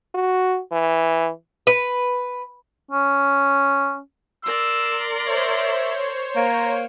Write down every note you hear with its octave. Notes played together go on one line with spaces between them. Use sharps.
F#4
E3
B4
C#4
A#4 D5 C6 E6
C5 C#5 E5
A#3 A#5